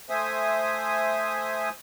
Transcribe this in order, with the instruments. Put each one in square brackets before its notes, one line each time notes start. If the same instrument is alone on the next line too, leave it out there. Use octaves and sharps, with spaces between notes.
[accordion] A3 C5 E5 G#5 D#6